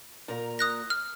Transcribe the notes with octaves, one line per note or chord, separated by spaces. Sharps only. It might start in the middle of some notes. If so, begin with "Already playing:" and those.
A#2 A#4 A#5
D#6 F#6 A#6
F6